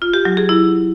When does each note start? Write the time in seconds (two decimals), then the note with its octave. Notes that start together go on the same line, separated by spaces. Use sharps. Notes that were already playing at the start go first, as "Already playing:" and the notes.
0.02 F4
0.14 G4
0.25 F#3
0.37 G#4
0.49 E4